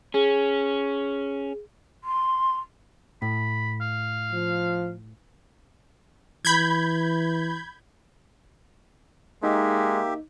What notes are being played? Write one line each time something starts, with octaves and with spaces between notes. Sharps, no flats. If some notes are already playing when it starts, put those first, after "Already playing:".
C#4 G#4
C6
A2 B5
F5
F3
E3 B5 G6 G#6
G#3 A#3 D#4 G4 E5